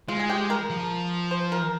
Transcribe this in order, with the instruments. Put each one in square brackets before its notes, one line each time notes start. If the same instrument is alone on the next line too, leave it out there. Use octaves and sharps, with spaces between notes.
[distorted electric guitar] G#3 [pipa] F4
[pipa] G#4
G4
A#4
[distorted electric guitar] F3
[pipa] C5
A#4